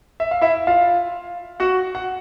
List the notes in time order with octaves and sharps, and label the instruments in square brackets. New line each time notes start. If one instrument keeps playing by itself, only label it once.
[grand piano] E5
F5
E4 E5
F4 F5
F#4 F#5
F#5